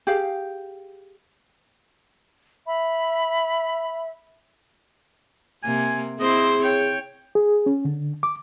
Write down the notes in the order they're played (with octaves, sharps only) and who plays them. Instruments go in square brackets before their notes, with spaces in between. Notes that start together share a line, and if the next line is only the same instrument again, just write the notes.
[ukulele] G4 G#4 F5
[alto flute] E5 [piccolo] B5
[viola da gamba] C3 A#3 [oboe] G#5
[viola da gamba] C4 E4 C5 [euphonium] G#4 [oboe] D#5
[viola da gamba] C#5 [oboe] G5
[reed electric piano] G#4
C#4
D3
D6